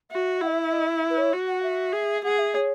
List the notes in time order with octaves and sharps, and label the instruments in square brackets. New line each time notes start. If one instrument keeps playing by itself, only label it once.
[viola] F#4 [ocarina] E5
[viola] E4 [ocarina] F#5
[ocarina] D#5
E5
E5
D#5
E5
B4
C#5
[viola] F#4
[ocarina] F#5
E5
[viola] G#4
[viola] G#4 [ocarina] F#5
[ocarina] E5
C#5